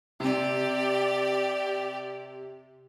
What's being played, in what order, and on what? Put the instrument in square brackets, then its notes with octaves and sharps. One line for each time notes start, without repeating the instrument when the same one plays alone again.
[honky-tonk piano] C3 [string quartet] G4 D5